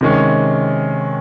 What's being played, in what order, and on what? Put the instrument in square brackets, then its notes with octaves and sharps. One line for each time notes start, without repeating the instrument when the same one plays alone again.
[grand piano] C3 D#3 G#3 C#4